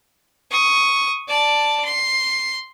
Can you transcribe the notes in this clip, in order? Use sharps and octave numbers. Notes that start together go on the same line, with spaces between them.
C#6 D#6
D5 A5
C6